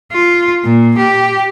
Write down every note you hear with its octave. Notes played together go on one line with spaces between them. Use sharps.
F4
A#2
G4